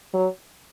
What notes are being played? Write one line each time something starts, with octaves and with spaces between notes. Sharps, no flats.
F#3